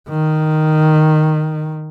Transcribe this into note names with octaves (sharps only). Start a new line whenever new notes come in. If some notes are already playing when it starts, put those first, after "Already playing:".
D#3